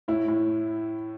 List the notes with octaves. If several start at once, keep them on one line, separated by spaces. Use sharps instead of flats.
A2 E4
A2